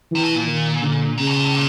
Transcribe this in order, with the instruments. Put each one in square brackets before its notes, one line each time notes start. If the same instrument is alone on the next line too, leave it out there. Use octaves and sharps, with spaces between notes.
[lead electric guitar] C3 [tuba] E3
[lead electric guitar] B2
A#2
[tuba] D#3
D3
[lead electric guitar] A#2 [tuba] C#3
[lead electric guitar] B2
A#2
A2
A#2